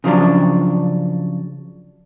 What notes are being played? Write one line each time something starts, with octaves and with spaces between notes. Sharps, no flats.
C#3 F3 F#3 D4